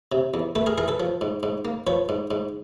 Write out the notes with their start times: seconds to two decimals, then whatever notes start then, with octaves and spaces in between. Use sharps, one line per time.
0.12 C3
0.34 E2
0.55 A3 A4 B4
0.66 G#4 A#4
0.78 E3 G#4 A#4
0.88 A4 B4
1.00 F3
1.21 G#2
1.43 G#2
1.65 A#3
1.87 F3 B4 C#5
2.09 G#2
2.31 G#2